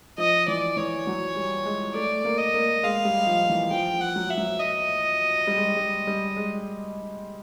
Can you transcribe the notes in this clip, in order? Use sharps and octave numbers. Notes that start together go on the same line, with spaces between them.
F3 D#5
E3 D5
E3 C#5
F#3
G3
G#3
A3 D5
A#3
D#5
A#3
G#3 F5
G3
F3
E3
F3 G5
F3
F#5
F#3
E5
F#3
D#5
G3
G#3
G3
G3
G3
G#3